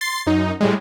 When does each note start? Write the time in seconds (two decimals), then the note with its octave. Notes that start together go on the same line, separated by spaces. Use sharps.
0.01 C6 A6 C7
0.26 F#2 D#4
0.60 A2 G3 G#3